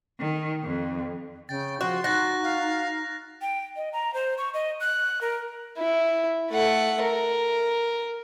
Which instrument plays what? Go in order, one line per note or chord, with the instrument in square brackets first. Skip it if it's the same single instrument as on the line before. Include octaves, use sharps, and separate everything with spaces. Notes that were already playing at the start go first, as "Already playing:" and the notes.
[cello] D#3
F2
[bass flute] C#3 [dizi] G5 [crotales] A6
[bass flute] F3 [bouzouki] F#4 [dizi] C6
[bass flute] D#4 [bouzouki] F#4 [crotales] F#6 A6 A#6
[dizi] F5
[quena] G5
D#5
A#5
C5
C#6
D#5
F#6
A#4
[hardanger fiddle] E4
A3 F#5
A#4